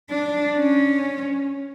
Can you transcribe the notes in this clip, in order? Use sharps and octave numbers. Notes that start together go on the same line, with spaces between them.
D4
C#4